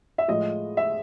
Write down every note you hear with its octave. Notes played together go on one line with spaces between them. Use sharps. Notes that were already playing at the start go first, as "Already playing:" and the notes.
E5
A2 F3 G#3 D#5
E5